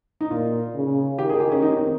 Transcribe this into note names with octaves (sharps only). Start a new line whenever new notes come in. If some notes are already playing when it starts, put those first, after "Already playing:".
D#4
A#2 F4
C#3
D#3 G4
G#4
G4
C#4
D#4
C4